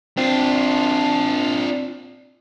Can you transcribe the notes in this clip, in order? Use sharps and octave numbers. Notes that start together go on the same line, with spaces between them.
C4 D4 F4